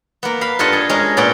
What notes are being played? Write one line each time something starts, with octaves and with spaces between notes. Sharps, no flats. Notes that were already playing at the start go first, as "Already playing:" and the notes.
A#3 B3
F5 B5
G2 F4 A4 D#5 F#5 A5
G#4
G#3 C#4 G#4 A#4
A#2 B3 C#4 D5 G5